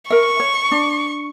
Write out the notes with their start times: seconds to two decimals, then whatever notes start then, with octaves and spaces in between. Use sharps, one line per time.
0.10 A#4 E5 C#6
0.40 C#5
0.72 D4